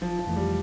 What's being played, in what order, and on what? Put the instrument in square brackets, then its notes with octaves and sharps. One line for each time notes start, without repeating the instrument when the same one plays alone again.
[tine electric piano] G1 [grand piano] F3
[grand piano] F3
[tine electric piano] F2 E3 A3
[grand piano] G3